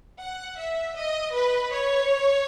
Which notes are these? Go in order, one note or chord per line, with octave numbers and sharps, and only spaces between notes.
F#5
E5
D#5
B4
C#5